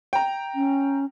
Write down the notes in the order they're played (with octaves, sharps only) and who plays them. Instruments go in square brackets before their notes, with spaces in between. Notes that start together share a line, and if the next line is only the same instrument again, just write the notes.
[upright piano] G5 A#5
[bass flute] C#4